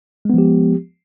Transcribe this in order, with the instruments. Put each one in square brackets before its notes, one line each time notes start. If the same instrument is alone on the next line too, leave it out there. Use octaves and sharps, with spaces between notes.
[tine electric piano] G#3
B3
F3
G4